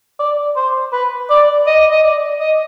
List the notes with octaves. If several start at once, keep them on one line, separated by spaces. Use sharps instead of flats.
D5
C5
B4
D5
D#5
D#5
D5
D#5